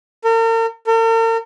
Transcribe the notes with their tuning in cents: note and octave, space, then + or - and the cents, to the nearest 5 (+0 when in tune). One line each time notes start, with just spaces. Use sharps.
A#4 -40
A#4 -45